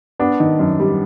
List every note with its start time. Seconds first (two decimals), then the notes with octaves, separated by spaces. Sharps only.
0.19 B3 D4
0.40 D#3
0.59 F#2
0.80 G3